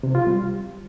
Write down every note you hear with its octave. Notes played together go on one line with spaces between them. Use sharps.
C3
F4
G3